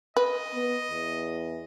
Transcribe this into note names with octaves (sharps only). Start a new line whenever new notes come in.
B4 D#5
B3
E2